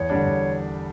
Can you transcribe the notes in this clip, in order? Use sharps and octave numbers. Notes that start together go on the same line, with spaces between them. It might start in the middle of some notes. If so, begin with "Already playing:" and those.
Already playing: E2 C#5
D3 G3 D4
E2